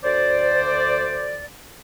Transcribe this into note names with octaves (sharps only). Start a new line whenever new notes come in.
D2 C5 D5